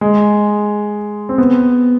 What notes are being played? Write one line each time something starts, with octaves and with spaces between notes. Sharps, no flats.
G#3
C4
B3